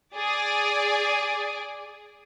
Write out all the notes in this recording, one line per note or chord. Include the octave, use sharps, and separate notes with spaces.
G#4 D5